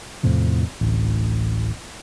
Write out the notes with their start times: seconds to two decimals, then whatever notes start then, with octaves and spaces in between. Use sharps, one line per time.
0.23 E2 A2 C3 F3
0.81 D1 A1